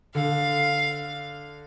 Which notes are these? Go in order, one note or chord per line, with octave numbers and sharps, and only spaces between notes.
D3 F5